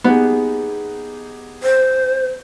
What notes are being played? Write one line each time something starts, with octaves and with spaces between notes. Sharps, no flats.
B3 D#4 G4 G#4
C5